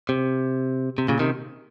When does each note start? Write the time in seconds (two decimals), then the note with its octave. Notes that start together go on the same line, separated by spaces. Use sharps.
0.09 C3
0.98 C3
1.08 A#2 C#3
1.19 C3 D#3